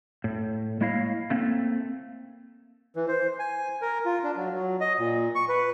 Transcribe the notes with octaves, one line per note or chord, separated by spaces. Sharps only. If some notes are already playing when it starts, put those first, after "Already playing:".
A2
G#3 A#3 E4 C#5 D#5 F5
A3 A#3 C4
E3
C5
G#5
A#4
F4
D4
F#3
F#3
D#5
A#2
C#6
B4